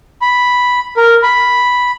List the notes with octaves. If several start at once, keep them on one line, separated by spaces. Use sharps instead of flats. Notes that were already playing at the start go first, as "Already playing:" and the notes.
B5
A#4
B5